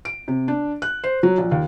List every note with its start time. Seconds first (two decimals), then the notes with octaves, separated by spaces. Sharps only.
0.05 D7
0.28 C3
0.48 D4
0.82 F#6
1.04 C5
1.23 F#3
1.38 A#1
1.51 D#2